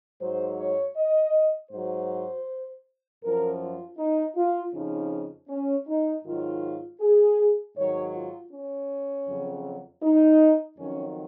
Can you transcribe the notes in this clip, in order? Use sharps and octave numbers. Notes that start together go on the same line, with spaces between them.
G#2 F#3 C5
C#5
D#5
G#2 F#3 C5
F#2 F3 A#4
F4
D#4
F4
F2 C#3 F3 D#4
C#4
D#4
G#2 D#3 F#3 F4
G#4
G#2 D#3 F#3 C#5
F4
C#4
F2 C#3 F#3
D#4
F2 D#3 F#3 C#4